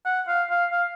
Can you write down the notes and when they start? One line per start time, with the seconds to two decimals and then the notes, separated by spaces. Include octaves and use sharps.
0.05 F#5
0.28 F5
0.50 F5
0.72 F5